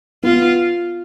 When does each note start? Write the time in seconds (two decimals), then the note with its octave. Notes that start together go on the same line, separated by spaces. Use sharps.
0.23 B3 F4